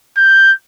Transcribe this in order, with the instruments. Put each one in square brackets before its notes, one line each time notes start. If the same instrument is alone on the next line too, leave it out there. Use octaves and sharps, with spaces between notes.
[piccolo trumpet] G6